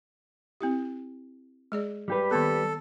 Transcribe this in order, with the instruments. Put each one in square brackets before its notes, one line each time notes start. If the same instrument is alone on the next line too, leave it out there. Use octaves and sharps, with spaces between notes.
[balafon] C4 E4 G4
G#3 G#4 D5
[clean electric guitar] G3 G4 B4
[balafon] D#3 A#3 B3 [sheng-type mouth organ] A4